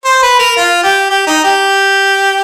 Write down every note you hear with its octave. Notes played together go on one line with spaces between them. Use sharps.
C5
B4
A#4
F4
G4
G4
D#4
G4